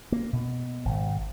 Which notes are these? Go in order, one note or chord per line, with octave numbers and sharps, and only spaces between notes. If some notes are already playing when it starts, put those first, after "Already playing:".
A#3
B2
G#1